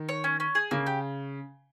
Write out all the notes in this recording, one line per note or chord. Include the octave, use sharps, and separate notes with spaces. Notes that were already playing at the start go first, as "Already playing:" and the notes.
Already playing: D#3
C#5
C#4
C#4
G#4
C#3 A#3
G4